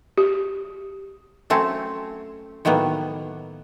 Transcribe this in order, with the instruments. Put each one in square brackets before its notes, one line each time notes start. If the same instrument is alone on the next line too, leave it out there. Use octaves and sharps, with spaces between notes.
[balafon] G4
[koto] F#3 A3 C4 C#4
A2 D#3 F#3 A#3 B3